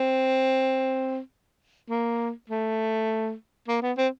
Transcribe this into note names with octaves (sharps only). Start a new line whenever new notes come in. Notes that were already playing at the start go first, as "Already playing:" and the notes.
Already playing: C4
A#3
A3
A#3
B3
C4